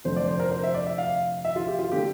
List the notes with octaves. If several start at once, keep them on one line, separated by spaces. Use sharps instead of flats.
F1 F2 D3 F3 C5
D5
C5
A#4
C5
E5
D5
E5
F5
E5
F4
G4
F4
D3 A3 G4